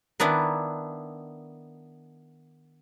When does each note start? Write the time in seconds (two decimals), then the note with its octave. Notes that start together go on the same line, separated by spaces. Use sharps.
0.20 D#3 B3 D4 E4